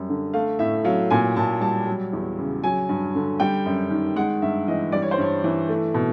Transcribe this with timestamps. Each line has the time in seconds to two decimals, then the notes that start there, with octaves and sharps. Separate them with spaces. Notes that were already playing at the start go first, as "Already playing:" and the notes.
Already playing: F#2 G3
0.09 D3
0.34 A3 F5
0.59 A2 E5
0.85 F#3 F5
1.10 A#2 G#5
1.36 A#2 A5
1.61 G3 A5
1.87 F#3
2.13 E2
2.39 C#3
2.64 F#3 G#5
2.89 G2
3.15 D3
3.40 G3 G5
3.65 F#2
3.90 D#3
4.16 G#3 F#5
4.42 G2 E5
4.68 E3 D#5
4.92 G3 D5
5.02 C#5
5.11 C5
5.18 G2 C#5
5.44 E3
5.69 A3
5.94 B2